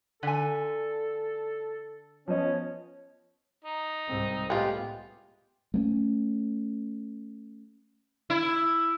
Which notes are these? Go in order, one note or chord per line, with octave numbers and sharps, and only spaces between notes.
D3 A4 G#5
F3 B3 C#4 C#5 D#5
D#4
C2 G#2 C4
A2 G#3 B3 F4 G4
A3 A#3 C#4
E4